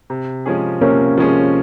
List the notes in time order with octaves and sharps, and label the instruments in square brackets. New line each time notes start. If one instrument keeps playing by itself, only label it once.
[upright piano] C3
F3 G#3 C#4 G#4
[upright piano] C3 [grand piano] A#3 C#4
[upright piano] F3 G#3 C#4 G#4